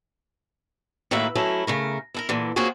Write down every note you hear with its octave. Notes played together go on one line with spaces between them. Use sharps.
A2 D#3 A#3 F#4 B4 E5
F#3 A3 C#4 E4
C#3 A3 A#4
E4 A4 A#4
A#2 D3 E3
A#3 C4 C#4 F4 F#4 G#4